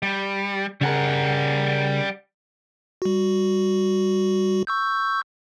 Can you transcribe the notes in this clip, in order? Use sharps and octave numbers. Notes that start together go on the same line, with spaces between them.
G3
C#3 G3 G#4 A#4 F#5
G3 F#4
C#6 E6 G6